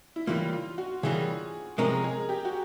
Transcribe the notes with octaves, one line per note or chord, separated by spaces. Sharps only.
E4
C#3 E3 G3 A#3 F4
F4
F#4
C#3 E3 G3 A#3 G#4
C3 F3 G#3 C#4 A#4
G#4
G4
F#4